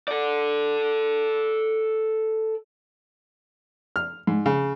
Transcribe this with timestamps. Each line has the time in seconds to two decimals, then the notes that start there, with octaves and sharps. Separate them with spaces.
0.08 A4 D5
3.96 F6
4.27 G#2
4.46 C#3